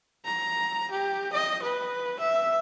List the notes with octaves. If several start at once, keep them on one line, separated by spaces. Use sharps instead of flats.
A#5
G4
D#5
B4
E5